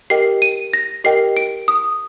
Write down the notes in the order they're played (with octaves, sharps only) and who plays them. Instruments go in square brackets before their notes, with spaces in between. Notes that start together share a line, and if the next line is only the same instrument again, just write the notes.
[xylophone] G4 A#4 D#5 G5 C7
D#7
A#6
G4 A#4 D#5 G5 C7
D7
D#6